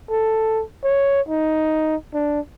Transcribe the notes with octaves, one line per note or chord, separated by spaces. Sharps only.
A4
C#5
D#4
D4